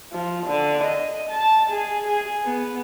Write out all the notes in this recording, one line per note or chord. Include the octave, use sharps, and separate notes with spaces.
F3
D3
D#5
A5
G#4
G#4
B3